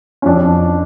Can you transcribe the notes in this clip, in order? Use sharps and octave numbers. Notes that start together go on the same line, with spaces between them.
C#4
F2 D4